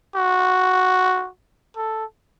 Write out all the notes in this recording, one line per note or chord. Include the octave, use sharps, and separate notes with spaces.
F#4
A4